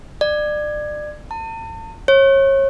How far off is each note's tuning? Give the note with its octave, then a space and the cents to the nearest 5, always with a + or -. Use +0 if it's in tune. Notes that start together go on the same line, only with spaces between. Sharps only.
D5 +30
A5 +40
C#5 -30